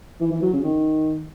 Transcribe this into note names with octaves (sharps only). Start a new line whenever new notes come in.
E3
E3
F#3
C#3
D#3